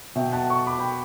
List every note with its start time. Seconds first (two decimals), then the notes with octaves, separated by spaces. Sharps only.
0.15 B2 E5 G5
0.33 F#5 A5
0.50 A5 C#6
0.67 B5 D6
0.79 G5 B5